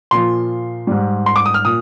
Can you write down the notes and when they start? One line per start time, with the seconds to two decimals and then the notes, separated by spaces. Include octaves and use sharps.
0.11 A#2 F3 C6
0.87 G#2 G3
1.26 C6
1.36 D6
1.46 D#6
1.54 F6
1.65 A#2 D#6